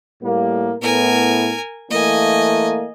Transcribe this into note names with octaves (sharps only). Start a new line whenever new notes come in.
A2 G3 A#3
A2 B3 A#4 G#5
E3 A3 A#3 D#5 G#5